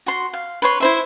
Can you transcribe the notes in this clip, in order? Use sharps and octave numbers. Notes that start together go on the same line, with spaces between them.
F#4 C6
F5
B4 C#5 C6
E4 C5 E5